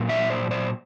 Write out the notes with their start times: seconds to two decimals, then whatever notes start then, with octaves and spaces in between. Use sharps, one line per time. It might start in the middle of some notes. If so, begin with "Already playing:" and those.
Already playing: A#2 F#3 A#3
0.09 D5 E5
0.30 C5 D5
0.51 C5 D5